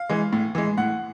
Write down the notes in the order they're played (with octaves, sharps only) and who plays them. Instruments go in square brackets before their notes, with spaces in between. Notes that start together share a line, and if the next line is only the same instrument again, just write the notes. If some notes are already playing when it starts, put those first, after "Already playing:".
Already playing: [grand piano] F5
E3 G#3
A2
E3 G#3
A2 F#5